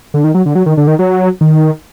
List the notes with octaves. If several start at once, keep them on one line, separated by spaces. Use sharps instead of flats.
D3
D#3
F#3
D3
F#3
D#3
D3
D#3
F#3
D#3